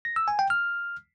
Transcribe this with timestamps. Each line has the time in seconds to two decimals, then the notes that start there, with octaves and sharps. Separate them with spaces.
0.05 A#6
0.16 E6
0.28 G#5
0.39 G5
0.50 F6